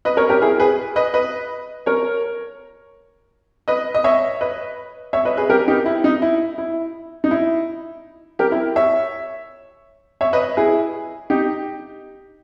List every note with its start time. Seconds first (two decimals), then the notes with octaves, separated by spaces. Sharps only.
0.05 B4 D#5
0.17 A#4 C#5
0.29 G4 A#4
0.42 E4 G#4
0.60 G#4 B4
0.96 B4 D#5
1.14 B4 D#5
1.86 A#4 C#5
3.68 B4 D#5
3.95 D#5
4.04 C#5 E5
4.41 B4 D#5
5.13 C#5 E5
5.25 B4 D#5
5.37 G#4 B4
5.50 G4 A#4
5.68 D#4 G4
5.86 E4
6.04 D#4
6.22 E4
6.58 E4
7.24 D#4
7.31 E4
8.39 G4 A#4
8.52 E4
8.76 C#5 E5
10.21 C#5 E5
10.33 B4 D#5
10.57 E4 G#4
11.30 D#4 G4